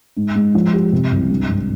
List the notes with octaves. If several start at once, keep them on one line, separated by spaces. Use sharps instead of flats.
G#2
G#3
F3
G4
C3
C2
G2
G#1